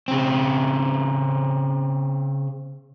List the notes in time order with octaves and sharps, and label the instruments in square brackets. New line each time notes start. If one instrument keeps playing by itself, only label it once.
[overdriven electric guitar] C#3 C4